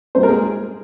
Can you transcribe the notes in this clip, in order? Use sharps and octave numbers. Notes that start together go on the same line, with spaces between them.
C2 A#2 G3 A#3 C4 C5
A#4
G#3 G#4